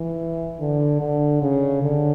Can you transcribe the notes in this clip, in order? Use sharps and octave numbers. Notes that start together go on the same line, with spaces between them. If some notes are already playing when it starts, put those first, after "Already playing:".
Already playing: E3
D3
D3
C#3
D3